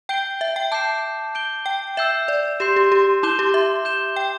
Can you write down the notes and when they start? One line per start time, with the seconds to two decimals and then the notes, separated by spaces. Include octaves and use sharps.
0.09 G5 G6 D7 G7
0.41 E5
0.56 G5
0.72 A5 D6 G6 C7 E7
1.35 G6 D7 G7
1.66 G5
1.97 E5 E6 G6 C7 E7
2.28 D5
2.60 G4 C6 G6 C7 E7
2.76 G4
2.92 G4
3.23 E4 A5 D6 G6 E7 G7
3.39 G4
3.54 E5
3.85 G6 E7 G7
4.16 G5